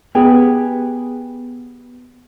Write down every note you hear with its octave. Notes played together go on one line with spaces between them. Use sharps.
B3 G4 G#4